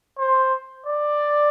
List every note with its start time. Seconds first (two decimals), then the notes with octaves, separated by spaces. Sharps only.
0.18 C5
0.87 D5